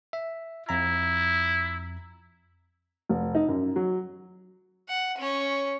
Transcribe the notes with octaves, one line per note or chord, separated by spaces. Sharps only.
E5
F2 E4 A#5
F1
D#4
F#2
F#3
F#5
C#4 C#5